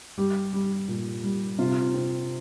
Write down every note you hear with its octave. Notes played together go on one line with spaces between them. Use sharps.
G3 G4
G3
A#2
G3
C3 F4
C4